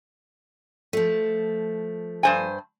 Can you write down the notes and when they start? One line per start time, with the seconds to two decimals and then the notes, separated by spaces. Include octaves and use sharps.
0.93 F3 A3
2.23 G2 C5 G#5